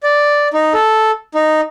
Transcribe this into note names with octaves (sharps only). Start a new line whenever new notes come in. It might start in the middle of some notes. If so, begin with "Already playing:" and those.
D5
D#4
A4
D#4